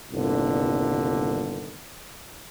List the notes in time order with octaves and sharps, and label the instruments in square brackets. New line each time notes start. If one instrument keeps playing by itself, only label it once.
[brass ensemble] G1 C2 A#2 D3 D#3